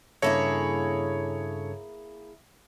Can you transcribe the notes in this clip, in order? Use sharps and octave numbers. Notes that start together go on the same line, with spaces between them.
G2 C#3 A#3 E4 G#4 A4 C#5